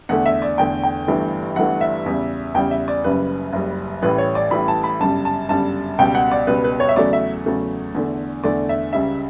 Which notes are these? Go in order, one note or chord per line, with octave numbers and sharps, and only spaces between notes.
E2 D3 A3 F#5
E5
D5
E2 D3 A3 G5
G5
G1 G2 E3 A3
G1 G2 E3 A3 F#5
E5
E2 C#3 G3
E2 C#3 G3 G5
E5
D5
F#1 F#2 C#3 G3 B4
F#1 F#2 C#3 G3
A1 A2 E3 G3 B4
C#5
D5
A1 A2 E3 G3 B5
A5
B5
G1 F#2 C#3 G3 A5
A5
G1 F#2 C#3 G3 A5
C#2 B2 G3 G5
F#5
D5
C#2 B2 G3 B4
B4
C#5
E5
E2 C#3 F#3 A3 D5
E5
E2 C#3 F#3 A3
E2 D3 A3
E2 D3 A3 D5
E5
C#2 C#3 G3 E5